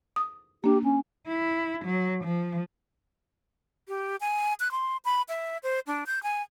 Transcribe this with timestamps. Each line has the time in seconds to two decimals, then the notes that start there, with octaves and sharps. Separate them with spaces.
0.16 D#6
0.64 A#3 D4 G4
0.84 C#4
1.28 E4
1.85 F#3
2.24 F3
3.88 G4
4.21 G#5
4.60 F#6
4.71 C6
5.05 B5
5.29 E5
5.63 C5
5.87 D4
6.06 G6
6.23 G#5